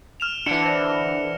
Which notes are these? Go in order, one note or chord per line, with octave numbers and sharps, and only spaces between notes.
F6 E7 F7
D3 E3 D4 A5 C#7
C5 D5 A#6 C#7